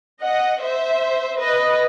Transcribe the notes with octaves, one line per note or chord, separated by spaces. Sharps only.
D#5 F#5
C5 E5
B4 D#5